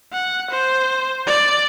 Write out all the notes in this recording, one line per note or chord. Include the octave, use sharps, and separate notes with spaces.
F#5
C5
D5